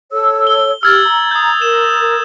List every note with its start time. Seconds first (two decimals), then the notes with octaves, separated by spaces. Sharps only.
0.12 A4 C#5 E6
0.47 G7
0.83 G4 E6 F6 G#6 A6
1.05 A#5
1.31 D#6 G6
1.62 A#4 E7